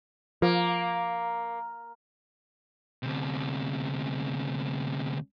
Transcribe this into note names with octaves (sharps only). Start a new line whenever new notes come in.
F3 A#3
D2 C3